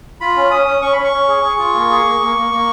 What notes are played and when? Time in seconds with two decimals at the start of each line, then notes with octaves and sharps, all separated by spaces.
0.21 F4 B5
0.36 C#4
0.51 C#4 D#6
0.66 C#4
0.82 C#4 C#6
0.93 C#4 B5
1.04 C#6
1.13 C#4
1.28 G#4
1.43 G#4
1.59 F4
1.74 A#3
1.90 G#4
2.05 A#3
2.20 A#3
2.36 A#3
2.51 A#3